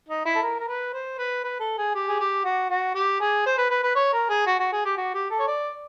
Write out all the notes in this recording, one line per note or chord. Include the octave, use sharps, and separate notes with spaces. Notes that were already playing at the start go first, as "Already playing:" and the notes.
D#4
E4
A4
A#4
A#4
B4
C5
B4
B4
A4
G#4
G4
G#4
G4
F#4
F#4
G4
G#4
C5
B4
B4
B4
C#5
A#4
G#4
F#4
F#4
G#4
G4
F#4
G4
A4
C#5
D5